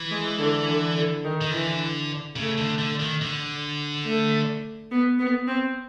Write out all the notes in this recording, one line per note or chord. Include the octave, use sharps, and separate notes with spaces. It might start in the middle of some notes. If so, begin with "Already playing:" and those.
Already playing: E3
G#3
D3
D3
D3
D#3
D#3
D3 E3
C#3 A3
D3
D3
D#3
D3
A3
B3
B3
C4